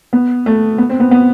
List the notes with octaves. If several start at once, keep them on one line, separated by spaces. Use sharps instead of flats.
B3
A3
B3
C4
B3
B3